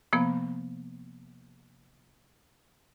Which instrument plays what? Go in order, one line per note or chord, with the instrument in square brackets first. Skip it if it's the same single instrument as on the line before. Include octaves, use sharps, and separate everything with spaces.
[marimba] C3 F3 A#3 B3